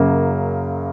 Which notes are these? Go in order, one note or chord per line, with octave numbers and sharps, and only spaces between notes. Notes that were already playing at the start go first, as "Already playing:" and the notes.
Already playing: F#2 C#3 F#3 A#3